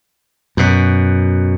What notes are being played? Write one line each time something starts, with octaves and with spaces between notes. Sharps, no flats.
F#2 B2